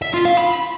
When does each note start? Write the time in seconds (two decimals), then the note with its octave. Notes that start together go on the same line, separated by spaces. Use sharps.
0.02 E5
0.14 F4
0.25 F5
0.37 B5